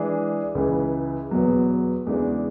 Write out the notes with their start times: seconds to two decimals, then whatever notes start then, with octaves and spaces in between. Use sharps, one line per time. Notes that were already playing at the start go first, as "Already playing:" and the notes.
Already playing: E3 G#3 D4 G#4
0.55 C#2 C#3 E3
1.31 E2 B2 F#3
2.06 E2 C#3 E3 G#3 D4